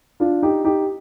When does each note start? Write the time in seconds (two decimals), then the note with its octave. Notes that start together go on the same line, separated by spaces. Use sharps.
0.20 D4 F4
0.43 D#4 G4
0.64 D#4 G4